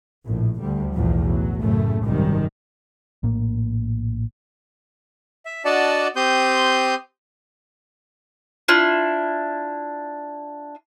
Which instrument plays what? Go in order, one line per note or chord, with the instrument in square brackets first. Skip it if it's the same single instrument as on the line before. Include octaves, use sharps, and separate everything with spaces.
[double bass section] A#1 A2
D2 G3
B1 E2 A2 F3
F#3
F#2 A2 C#3 A3
G#1 F#2 C3 D#3 G3
[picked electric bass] A#1 A2 A#3
[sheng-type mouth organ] E5
D4 F#4 D5 D#5 F#5 A5
C4 G4 C6 D#6 G6
[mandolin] D4 E4 F4